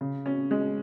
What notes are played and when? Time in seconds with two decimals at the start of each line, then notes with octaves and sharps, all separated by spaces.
0.01 C#3
0.26 C#4
0.51 G#3